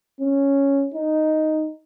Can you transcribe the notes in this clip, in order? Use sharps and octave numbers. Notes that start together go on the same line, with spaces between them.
C#4
D#4